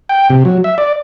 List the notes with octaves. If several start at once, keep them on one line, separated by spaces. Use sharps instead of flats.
G5
C3
F#3
E5
D5